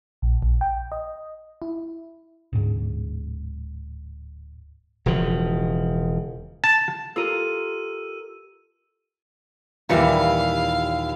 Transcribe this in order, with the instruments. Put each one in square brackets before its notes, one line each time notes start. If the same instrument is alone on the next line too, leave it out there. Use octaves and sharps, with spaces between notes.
[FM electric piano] A#1
A#1
G5
D#5
E4
[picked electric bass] D1 G#2
[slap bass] E1 C#3 F3
[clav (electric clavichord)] A5
[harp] F4 A#4 [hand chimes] G4 A4 [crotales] E6 D#7
[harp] D#2 E4 C#7 [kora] A#2 E3 G3 [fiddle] F5